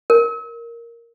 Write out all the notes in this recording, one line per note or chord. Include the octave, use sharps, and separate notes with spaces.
A#4